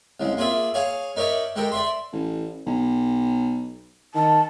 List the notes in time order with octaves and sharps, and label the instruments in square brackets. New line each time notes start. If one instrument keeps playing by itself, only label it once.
[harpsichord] C2 C#3 G#3
A#3 F4 G#4 D5 E5
G#4 C#5 F5 G#5
D#4 A#4 C#5 D5 E5
G#3 G4 A4 A#4 G5
D5 E5 C6
[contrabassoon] A1
B1
[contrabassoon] D#3 [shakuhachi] A5